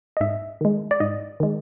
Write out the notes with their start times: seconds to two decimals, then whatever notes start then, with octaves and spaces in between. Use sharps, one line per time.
0.17 D#5
0.21 G#2 E5
0.61 D#3 G#3
0.91 D5
1.00 G#2 D#5
1.40 D#3 G#3